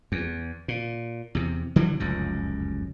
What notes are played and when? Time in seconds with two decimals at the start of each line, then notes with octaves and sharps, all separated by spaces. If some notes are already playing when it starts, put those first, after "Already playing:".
0.12 E2
0.68 A#2
1.35 E2 C3
1.76 D3 E3 F#3 G3
2.00 F1 C#2 F#2